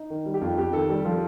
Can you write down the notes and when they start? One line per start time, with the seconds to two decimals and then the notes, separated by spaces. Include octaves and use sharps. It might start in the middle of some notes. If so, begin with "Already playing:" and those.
Already playing: D#4
0.10 D#3
0.26 G3
0.34 G4
0.41 F2 F4
0.57 F2 G4
0.73 D#3 A4
0.90 G3
1.05 F3 A4